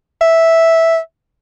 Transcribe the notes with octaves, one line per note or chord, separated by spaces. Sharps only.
E5